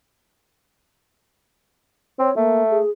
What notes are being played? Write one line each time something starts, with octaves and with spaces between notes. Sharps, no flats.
C4 C#5
A3 A#3
G#4